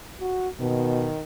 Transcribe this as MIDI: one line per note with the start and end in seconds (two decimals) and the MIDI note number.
0.21 0.49 66
0.60 1.12 47
0.60 1.23 51